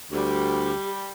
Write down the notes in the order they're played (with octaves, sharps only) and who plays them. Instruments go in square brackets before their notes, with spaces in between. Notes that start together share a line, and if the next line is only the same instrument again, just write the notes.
[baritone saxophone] D2 [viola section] G3 [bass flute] G4